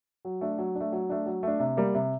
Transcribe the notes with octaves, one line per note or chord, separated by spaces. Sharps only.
F#3
A3 D4
F#3
D4
A3
F#3
A3 D4
F#3
A3 D4
C3
G3 A#3
C3